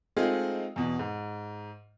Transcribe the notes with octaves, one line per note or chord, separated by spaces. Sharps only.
G#3 A3 C4 D#4 F4 G#4
E2 B2
G#2